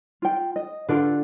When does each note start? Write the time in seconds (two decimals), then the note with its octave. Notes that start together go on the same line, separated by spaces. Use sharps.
0.22 F4 G5
0.56 D#5
0.89 D3 F4 A4 B4 D5